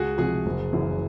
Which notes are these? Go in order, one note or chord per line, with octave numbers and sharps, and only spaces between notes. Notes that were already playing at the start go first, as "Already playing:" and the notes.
Already playing: C#2 F#4 G#4
C3 F3 F#4 G#4
F#1
F#2 C#3 E3